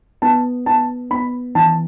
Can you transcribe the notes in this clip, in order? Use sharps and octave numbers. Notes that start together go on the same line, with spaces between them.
B3 A5
B3 A5
B3 B5
E3 A5